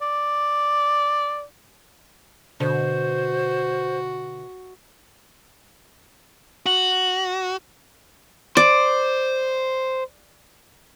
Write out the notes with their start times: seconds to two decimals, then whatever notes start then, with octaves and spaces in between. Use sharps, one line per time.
0.01 D5
2.60 B2 D3 F#4 C5
6.66 F#4 F#7
8.57 C5 D5